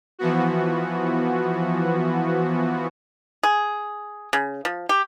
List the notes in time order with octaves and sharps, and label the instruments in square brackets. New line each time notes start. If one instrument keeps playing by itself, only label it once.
[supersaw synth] E3 F3 B3 F#4
[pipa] G#4
C#3
F3
G4